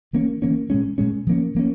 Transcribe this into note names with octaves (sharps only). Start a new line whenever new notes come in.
E3 A#3 C#4
E3 A#3 C#4
A#2 G#3 C#4
A#2 G#3 C#4
F3 A#3 C#4
F3 A#3 C#4